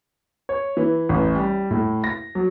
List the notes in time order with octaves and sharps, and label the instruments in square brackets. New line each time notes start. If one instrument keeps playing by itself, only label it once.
[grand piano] C#5
E3
A1
G3
A2
A#6
F#3